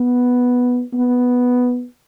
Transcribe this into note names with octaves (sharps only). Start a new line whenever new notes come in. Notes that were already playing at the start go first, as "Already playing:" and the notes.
Already playing: B3
B3